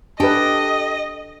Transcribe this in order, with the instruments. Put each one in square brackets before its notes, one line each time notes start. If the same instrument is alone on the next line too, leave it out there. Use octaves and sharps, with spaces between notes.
[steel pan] D4 B4 [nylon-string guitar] G4 A4 G5 [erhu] D#5